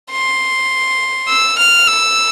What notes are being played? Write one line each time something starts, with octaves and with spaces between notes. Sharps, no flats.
C6
E6
F6
E6